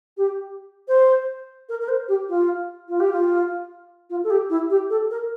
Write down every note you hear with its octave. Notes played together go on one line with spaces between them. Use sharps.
G4
C5
A#4
A#4
C5
G4
F4
F4
G4
F4
F4
A4
G4
E4
G4
A4
A#4